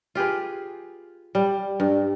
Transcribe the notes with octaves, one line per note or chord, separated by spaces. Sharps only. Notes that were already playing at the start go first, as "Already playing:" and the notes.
F4 G4 G#4 B4
G3
G2